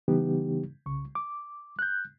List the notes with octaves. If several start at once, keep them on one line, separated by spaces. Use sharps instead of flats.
C#3 E3 G3 B3 D#4 G4
C2 C#3 C#6
D6
F#6 G6